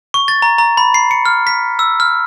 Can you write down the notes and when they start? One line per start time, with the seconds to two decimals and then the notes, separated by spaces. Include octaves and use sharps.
0.14 C#6
0.28 A6
0.42 A#5
0.58 A#5
0.77 B5
0.94 C7
1.11 C#7
1.25 F6
1.47 B6
1.79 E6
2.00 F6